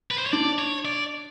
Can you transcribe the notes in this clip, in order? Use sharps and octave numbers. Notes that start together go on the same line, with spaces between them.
B4
C5
C#5
D4 D5
C#5
D5